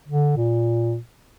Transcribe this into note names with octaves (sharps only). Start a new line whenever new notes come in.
D3
A#2